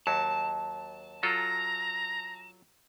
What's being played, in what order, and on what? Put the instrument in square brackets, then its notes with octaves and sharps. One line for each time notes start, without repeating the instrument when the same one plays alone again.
[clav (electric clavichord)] D#2 F#3 [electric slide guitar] A5
[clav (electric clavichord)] F#3 F4 A4 [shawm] A#5